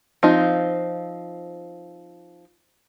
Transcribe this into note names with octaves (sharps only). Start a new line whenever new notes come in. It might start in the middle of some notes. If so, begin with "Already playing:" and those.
F3 C4 D#4 F4